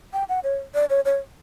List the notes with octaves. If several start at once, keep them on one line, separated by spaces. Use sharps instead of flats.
G5
F#5
C#5
D5
C#5
C#5